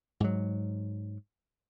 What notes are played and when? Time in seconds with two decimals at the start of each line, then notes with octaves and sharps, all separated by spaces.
0.20 G#2 F#3